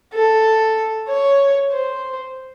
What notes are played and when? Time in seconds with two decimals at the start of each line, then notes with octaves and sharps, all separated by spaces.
0.13 A4
1.08 C#5
1.71 C5